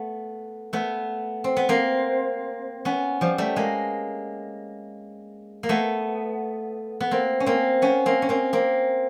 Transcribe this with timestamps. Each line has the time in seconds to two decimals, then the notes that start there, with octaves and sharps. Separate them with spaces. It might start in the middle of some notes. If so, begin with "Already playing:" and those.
Already playing: A3 B3
0.73 A3 B3
1.44 C4
1.57 B3
1.69 A#3 C4
2.85 B3 C#4
3.21 F3 G3
3.38 G3 A3
3.56 G#3 A#3
5.63 A#3
5.69 A3 B3
7.00 B3
7.11 A#3 C4
7.40 C#4
7.46 A#3 C4
7.82 B3 C#4
8.06 A#3 C4
8.22 C#4
8.29 A#3 C4
8.53 A#3 C4